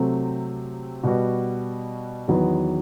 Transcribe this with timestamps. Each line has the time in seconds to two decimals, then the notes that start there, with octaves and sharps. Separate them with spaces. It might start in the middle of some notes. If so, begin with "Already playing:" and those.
Already playing: C3 F#3 A3 C4
1.03 B2 G3 B3 F#4
2.28 E2 D#3 F#3 B3